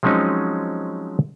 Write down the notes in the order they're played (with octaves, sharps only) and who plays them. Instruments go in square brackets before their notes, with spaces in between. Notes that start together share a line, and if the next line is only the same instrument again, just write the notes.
[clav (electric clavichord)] F3 F#3 G#3 C4 C#4 D#4